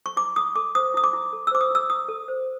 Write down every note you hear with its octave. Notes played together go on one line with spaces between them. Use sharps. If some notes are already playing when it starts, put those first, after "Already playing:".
C#6
E4 D6
E4 D#6
A4 D6
C5 D#6
E4 D#6
D6
E4
A4
E6
C5 D6
D#6
E4 E6
E4 D#6
A4
C5